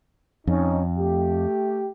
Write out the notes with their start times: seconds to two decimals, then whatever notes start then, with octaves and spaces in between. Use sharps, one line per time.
0.47 F2 C#4 D#4
0.97 A3 G4